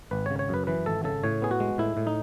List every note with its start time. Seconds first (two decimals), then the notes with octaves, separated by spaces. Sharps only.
0.11 G#1 B4
0.26 C#5
0.31 C#3
0.39 C#5
0.49 F#2 B4
0.67 E3 B4
0.86 G#1 A4
1.04 C#3 A4
1.24 A2 C#5
1.42 B3 G#4
1.51 F#4
1.60 G#3
1.78 A2 E4
1.97 A2
2.07 D#4